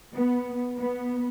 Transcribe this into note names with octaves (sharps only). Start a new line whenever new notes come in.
B3
B3